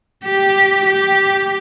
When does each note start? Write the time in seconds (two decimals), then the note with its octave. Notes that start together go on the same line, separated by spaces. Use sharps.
0.25 G4
0.87 G4